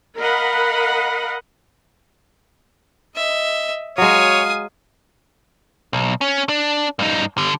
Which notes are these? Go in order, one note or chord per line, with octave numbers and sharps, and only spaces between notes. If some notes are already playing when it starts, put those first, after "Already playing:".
A#4 D#5 F5 F#5 B5
D#5 E5
F#3 G#3 C#5 F5 G#5 D#6
B1
C#4
D4
G2 D#4
D3 G3